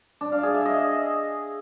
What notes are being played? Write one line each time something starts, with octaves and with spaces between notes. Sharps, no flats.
D4
F5
G#4
E5
D#5